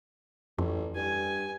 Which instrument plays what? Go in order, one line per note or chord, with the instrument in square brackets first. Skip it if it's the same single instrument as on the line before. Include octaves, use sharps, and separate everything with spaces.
[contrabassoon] A1 [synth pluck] F2
[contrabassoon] G2 [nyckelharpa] G#5